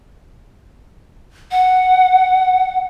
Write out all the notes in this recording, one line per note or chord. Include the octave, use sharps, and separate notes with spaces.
F#5